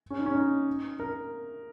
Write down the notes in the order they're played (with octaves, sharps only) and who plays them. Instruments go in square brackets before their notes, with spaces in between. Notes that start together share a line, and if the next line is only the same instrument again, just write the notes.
[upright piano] C#4
D#4
C#4
D#4
A#4